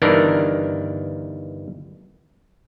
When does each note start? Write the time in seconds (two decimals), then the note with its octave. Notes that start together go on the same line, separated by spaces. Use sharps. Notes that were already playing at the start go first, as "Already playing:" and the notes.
0.02 G1 D#3 E3 D4 A#4